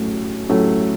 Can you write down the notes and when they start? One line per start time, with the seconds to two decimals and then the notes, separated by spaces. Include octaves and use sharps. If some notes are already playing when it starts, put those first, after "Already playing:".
Already playing: A2 F#3 A3 C#4
0.49 A2 F#3 A3 C#4